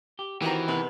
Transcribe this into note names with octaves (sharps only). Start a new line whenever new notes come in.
G4
D#3 E3 C4 F#4 G4 G5 A#5
C3 D#3 B3 G#4 B4